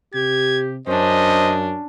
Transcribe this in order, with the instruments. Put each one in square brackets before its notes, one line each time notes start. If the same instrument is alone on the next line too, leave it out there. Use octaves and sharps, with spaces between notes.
[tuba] C3 [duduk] G4 [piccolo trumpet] G#6
[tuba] F#2 [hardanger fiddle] C#4 D4 [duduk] C5 [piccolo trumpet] D#5